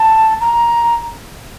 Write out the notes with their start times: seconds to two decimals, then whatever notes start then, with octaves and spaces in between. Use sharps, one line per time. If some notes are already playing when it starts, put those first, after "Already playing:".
Already playing: A5
0.41 A#5